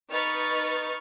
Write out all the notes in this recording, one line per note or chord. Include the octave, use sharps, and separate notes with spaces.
D#4 B4 C#6 F6 A6